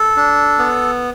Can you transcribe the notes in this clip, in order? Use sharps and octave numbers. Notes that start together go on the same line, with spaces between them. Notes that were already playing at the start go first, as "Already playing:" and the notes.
Already playing: A4
D4
B3